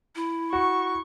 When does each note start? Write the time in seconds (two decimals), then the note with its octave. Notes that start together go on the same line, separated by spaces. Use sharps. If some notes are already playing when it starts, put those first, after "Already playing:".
0.15 E4
0.53 F#4 C#6